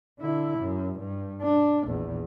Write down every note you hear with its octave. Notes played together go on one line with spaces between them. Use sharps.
D3 E4
F#2
G2
D4
A#1 E2